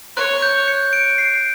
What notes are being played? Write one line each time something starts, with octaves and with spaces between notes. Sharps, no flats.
C#5 F#6
G6
C#7
D7
C7